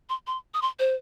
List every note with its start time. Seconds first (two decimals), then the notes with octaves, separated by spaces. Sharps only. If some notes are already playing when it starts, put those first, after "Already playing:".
0.09 C6
0.27 C6
0.54 D#6
0.62 C6
0.79 C5